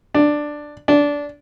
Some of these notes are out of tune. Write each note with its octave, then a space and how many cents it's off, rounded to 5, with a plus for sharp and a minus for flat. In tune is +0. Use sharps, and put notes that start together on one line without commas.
D4 +10
D4 -15